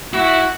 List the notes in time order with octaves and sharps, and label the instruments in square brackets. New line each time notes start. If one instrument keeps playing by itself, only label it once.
[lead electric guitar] E4 [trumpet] F#4